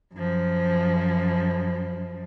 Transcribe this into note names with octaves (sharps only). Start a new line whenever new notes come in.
F#2 F3